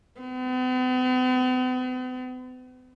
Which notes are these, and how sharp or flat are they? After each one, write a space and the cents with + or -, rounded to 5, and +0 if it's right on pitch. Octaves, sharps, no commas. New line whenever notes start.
B3 +45